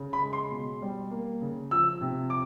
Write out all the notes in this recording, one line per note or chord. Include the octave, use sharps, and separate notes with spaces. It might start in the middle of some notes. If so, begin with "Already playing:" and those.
Already playing: C#3
B5
G#3
C6
B2
G3
A#3
C#3
F3 E6
C3
D6